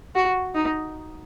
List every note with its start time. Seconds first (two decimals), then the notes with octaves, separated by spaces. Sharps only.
0.15 F#4
0.55 D#4